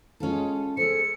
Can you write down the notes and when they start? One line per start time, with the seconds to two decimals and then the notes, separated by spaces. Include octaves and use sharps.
0.20 G#3 C#4 F4 A4
0.77 G#4 A4 C5 C#7